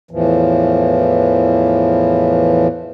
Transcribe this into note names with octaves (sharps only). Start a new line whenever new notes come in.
E2 A2 E3 F3